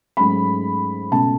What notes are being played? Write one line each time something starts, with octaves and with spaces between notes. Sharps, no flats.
G#2 F#3 A3 C#4 B5
C#2 B2 A3 A5